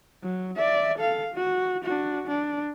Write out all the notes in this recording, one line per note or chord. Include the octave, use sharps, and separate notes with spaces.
F#3
D5 E5
A4 F5
F#4
D4 F#4
D4